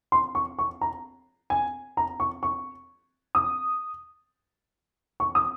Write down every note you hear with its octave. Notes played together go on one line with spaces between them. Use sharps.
C6
C#6
C#6
A#5
G#5
A#5
C#6
C#6
D#6
C#6
D#6